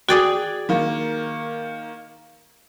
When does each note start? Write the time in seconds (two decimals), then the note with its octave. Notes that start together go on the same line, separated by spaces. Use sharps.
0.09 F#4 G#4 D5 G5
0.69 D#3 A#3